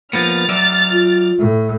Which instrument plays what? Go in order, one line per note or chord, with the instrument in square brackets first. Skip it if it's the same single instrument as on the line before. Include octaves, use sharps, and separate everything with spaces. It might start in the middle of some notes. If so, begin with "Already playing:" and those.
[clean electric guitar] F3 A#3 B3 [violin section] F6 A6
[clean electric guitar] F#3 D5 E5
[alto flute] F4
[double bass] A2